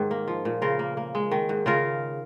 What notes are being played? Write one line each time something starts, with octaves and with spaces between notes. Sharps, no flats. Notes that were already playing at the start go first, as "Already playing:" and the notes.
Already playing: G#2 D#3
A#3
F3
A#2
C#3 F4 A#4
A#3
A#3
G#3
D#3
G#2
C#3 F4 A#4